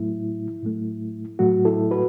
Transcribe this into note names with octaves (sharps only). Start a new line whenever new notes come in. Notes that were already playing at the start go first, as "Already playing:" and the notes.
Already playing: A2 F#3 A3 E4
A2 F#3 A3
A2 F#3 A3 F#4
E4 A4
F#4 B4